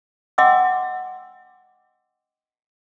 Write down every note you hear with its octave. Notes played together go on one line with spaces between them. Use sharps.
D#5 F#5 G5 C6 D6 E6